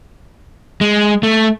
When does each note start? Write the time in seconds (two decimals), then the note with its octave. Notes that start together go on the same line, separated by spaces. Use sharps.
0.81 G#3
1.23 A3